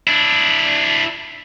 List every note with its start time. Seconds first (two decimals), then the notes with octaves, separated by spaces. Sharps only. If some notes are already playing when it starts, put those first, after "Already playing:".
0.07 D4 E4